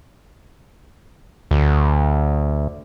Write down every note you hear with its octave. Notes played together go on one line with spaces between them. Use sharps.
D2